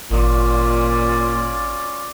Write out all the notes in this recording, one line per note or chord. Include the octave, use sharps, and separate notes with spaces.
G#1 A#2 C#4 F4 D5